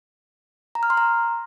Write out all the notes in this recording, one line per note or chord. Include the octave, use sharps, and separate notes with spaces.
A#5
F6
C6
A#5